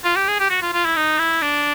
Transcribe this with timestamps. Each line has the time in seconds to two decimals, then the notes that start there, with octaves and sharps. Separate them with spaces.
0.04 F4
0.16 G4
0.28 G#4
0.40 G4
0.50 F#4
0.62 F4
0.73 F4
0.85 E4
0.96 D#4
1.19 E4
1.42 D4